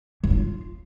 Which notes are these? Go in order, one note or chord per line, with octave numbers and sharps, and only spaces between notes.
F#3
D4
F4